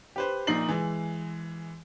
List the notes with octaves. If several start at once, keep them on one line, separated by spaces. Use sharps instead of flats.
G4 B4 C5
A#1 A#2 D#4 C7 F#7
E3 G#3